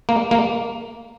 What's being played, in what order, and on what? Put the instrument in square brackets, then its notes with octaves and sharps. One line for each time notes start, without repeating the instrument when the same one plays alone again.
[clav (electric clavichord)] A#3
A#3